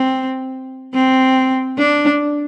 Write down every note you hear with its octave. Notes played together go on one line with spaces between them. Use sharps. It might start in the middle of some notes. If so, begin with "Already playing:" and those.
Already playing: C4
C4
D4